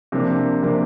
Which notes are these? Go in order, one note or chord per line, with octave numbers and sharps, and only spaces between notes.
C3 F3 A#3 D4
C3 F3 A#3 D4